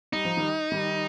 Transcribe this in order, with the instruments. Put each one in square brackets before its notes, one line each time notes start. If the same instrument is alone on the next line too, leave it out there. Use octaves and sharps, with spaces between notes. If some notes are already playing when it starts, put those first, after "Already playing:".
[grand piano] G3 [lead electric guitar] D#4
[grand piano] F3
D#3 G3
D#3 G3